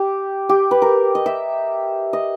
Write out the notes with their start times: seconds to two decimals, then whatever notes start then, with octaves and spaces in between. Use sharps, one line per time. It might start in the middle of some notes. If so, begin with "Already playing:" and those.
Already playing: G4
0.49 G4
0.71 B4
0.82 A#4
1.15 D#5
1.26 E5
2.13 D#5